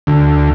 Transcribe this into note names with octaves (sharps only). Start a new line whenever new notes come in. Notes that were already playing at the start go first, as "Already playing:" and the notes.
D2